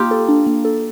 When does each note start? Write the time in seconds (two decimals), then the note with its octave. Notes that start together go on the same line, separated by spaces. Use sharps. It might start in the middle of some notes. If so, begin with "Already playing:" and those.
Already playing: A#3 D#4 F4 G4
0.11 A4
0.28 D4
0.47 A#3
0.65 A4